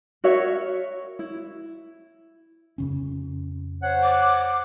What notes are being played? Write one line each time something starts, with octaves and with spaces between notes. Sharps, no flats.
F#4 A#4 C#5 E5
E4
F2 C#3 C#4
C5 C#5 F#5
D6